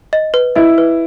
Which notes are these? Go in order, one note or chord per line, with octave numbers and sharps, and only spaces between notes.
D#5
B4
E4 D#5
B4